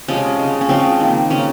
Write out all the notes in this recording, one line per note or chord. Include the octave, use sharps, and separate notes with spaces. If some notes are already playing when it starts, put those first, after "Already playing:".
C3 F3 G#3 C#4
C#3 G#3
C#4
C#3 F3 G#3 C4
D#3 A#3
C#3 F3 A#3 C#4